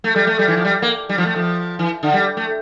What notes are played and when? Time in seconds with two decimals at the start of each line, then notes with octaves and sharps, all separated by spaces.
0.04 A3
0.16 G3
0.27 A3
0.39 G3
0.48 E3
0.57 F3
0.65 G3
0.82 A#3
1.09 G3
1.18 F3
1.26 A3
1.36 F3
1.79 E3
2.03 D3
2.14 G3
2.37 A3